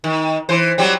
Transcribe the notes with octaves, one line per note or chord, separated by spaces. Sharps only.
D#3
E3 C5
F#3 G3 C4